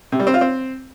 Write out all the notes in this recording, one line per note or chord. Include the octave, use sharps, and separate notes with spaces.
C3
G3
C4
F4
C4